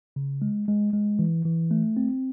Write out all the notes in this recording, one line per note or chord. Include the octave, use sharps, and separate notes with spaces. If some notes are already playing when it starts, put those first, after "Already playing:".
C#3
G#3
G#3
G#3
E3
E3
A3
C4